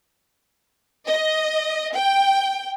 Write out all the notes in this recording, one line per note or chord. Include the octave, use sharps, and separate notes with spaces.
D#5
G5